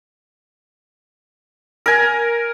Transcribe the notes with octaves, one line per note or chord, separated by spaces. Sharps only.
A#4 G#5